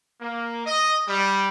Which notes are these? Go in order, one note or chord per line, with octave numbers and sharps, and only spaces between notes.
A#3
D#5
G3